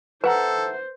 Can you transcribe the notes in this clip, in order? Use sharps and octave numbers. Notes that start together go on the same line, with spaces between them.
A4 B4 C5 E5 F#5 A#5